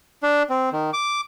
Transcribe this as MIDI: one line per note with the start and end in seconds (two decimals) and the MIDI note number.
0.23 0.43 62
0.49 0.69 60
0.73 0.91 51
0.93 1.21 86